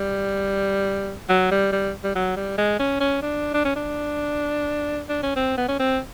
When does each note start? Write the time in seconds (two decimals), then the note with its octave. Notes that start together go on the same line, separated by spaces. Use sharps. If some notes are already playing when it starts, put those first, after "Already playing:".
Already playing: G3
1.29 F#3
1.51 G3
1.72 G3
2.04 G3
2.16 F#3
2.37 G3
2.58 G#3
2.80 C#4
3.00 C#4
3.22 D4
3.54 D4
3.65 C#4
3.76 D4
5.09 D4
5.23 C#4
5.36 C4
5.58 B3
5.68 C#4
5.80 C4